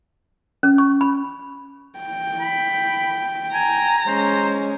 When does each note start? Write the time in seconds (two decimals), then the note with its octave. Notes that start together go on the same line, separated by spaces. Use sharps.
0.63 C#4
0.78 C#6
1.01 B5
1.99 G5
2.40 B5
3.54 G#5 A#5
4.07 G#3 C#4 C5